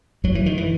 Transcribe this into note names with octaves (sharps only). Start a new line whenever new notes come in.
F#2 F#3
E3
D#3
E3